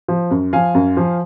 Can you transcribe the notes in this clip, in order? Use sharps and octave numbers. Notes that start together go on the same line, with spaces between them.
F3
F#2
F3 F5 G#5
F#2
F3